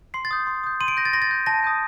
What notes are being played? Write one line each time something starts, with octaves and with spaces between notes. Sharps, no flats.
C6 C7
A6
D#6 G6
C6
D#6 G6
C6 D#7
D7
G6 A#6
A6
C6 A#6
A6
G6
A5 A#6
D#6 G6